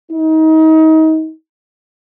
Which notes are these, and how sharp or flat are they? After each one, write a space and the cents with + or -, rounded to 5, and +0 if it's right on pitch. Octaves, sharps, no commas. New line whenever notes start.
D#4 +30